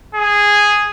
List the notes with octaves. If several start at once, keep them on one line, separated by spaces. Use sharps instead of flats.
G#4